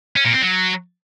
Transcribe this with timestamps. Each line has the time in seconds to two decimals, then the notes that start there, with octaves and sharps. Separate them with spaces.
0.16 C#4
0.25 A#2
0.33 C4
0.42 F#3